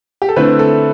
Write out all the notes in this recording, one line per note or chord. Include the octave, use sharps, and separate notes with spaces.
G4
A4
D3 A3 C4 E4 B4
A4